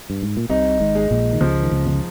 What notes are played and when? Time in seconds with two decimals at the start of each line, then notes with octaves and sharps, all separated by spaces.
0.10 G2
0.23 G#2
0.37 A#2
0.49 C2 C3 D#4
0.80 G#1 G#2
0.95 G#3
1.11 A#1 A#2
1.33 D#3
1.41 C#2 C#3 F3
1.62 D#3
1.72 C#2 C#3
1.87 F3